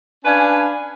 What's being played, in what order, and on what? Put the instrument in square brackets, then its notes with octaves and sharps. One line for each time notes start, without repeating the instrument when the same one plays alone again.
[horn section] C#4 D4 B4 F5 G#5